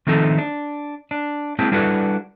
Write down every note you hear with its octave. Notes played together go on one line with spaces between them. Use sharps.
D#3 F3 A3 C4 D#4 A4
D4
D4
G#3 A#3 C4 E4 A5
G3 D4 E4 F#4 A4 B4